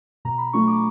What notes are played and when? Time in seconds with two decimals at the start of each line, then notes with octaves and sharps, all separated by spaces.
0.25 B2 A#5
0.38 B5
0.53 F#3 A3 D4 F4 C#6
0.67 D6